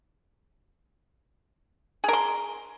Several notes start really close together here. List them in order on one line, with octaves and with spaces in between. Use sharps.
G#4 A#4 C6